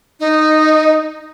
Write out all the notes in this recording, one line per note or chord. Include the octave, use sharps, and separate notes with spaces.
D#4